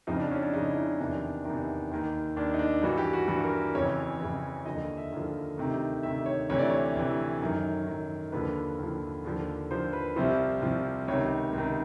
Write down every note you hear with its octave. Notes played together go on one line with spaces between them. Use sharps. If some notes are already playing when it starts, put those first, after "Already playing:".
F2 C#3 F3 D#4
D4
C#4
D4
F2 C#3 F3 D#4
E4
D#4
D4
E2 C3 D#3 D4
E2 C3 D#3
D#2 D#3
D#2 D#3 D4
D#4
D4
G2 E3 F#4
G4
F#4
G2 E3 F#4
A#4
F2 C#3 E3 C#5
F2 C#3 E3
D#2 D3 F3 D#5
E5
D#2 D3 F3
D2 C3 D#3
D2 C3 D#3 E5
C#5
D2 C3 E3 C#5
D5
C#5
D2 C3 E3
F#2 D#3
F#2 D#3
D#2 D3 F3 B4
D#2 D3 F3
D#2 D3 F3
D#2 D3 F3 C5
B4
C2 C3 F3 C5
C2 C3 F3
C#2 C3 D#3 C#5
C#2 C3 D#3